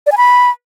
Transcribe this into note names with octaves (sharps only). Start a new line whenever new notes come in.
D5
G#5
B5